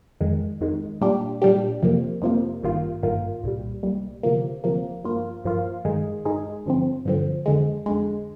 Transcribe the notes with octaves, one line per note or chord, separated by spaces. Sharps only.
F2 D#3 G#3
F2 D#3 G#3
A#2 G3 D4 G4
A#2 G3 D4 G4
F2 C3 F3 A#3
F2 C3 F3 A#3
G#1 G2 D#3 A#3 F4
G#1 G2 D#3 A#3 F4
C2 A#2 G3
C2 A#2 G3
D2 C3 F3 A#3
D2 C3 F3 A#3
G2 F3 A#3 F4
G2 F3 A#3 F4
G2 D#3 G#3 D#4 G#4
G2 D#3 G#3 D#4 G#4
G2 D3 F3 C4
G2 D3 F3 C4
F2 D3 G#3
F2 D3 G#3